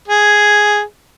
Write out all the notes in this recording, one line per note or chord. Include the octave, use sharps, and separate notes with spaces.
G#4